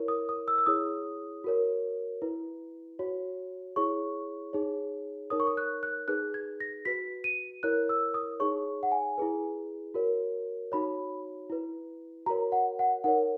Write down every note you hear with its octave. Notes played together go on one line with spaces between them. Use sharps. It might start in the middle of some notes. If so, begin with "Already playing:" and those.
Already playing: E4 A#4 C#5
D#6
D#6
E6
E6
E4 G#4 C#5 D#6
F#4 A#4 C#5
E4 B4
F#4 C#5
E4 G#4 C#5 C#6
D#4 G#4 C#5
D#4 A#4 C#5 D#6
C#6
D#6
F#6
F#6
D#4 G#4 B4 F#6
G#6
A#6
F#4 B4 B6
D#7
E4 A#4 C#5 F#6
E6
D#6
D#4 G#4 C#5 C#6
F#5
G#5
E4 G#4 B4
F#4 A#4 C#5
D#4 F#4 C#5 B5
E4 B4
F#4 A#4 C#5 A#5
F#5
F#5
D#4 A#4 C#5 F#5